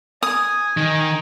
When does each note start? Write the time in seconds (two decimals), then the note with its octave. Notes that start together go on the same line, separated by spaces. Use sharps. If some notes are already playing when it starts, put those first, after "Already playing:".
0.23 G#5 D#6
0.77 D#3